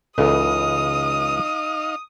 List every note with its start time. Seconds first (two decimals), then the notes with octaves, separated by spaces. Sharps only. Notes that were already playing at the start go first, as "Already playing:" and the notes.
0.18 C#2 E3 D#4 A4 D#5 F5 D#6